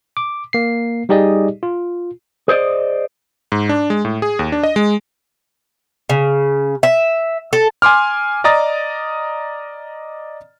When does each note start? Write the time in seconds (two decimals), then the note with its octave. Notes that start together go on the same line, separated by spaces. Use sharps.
0.17 D6
0.53 A#3 C7
1.09 G3 D#4 G4 G#4 D5 D#5
1.63 F4
2.48 G#4 C5 D5 D#5
3.52 G#2
3.69 D4
3.90 G#3
4.05 A2
4.22 G#4
4.39 D#2
4.52 D4
4.63 D#5
4.76 G#3
6.10 C#3
6.83 E5
7.53 A4
7.82 G#5 C6 D6 F6
8.44 D5 D#5 A#5 D#6 A6